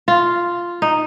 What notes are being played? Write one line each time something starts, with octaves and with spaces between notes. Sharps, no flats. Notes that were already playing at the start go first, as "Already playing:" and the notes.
F4
D#4